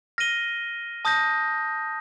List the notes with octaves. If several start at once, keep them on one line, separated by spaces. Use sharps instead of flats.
F6 A#6 D#7 G7
A5 D#6 G6 A#6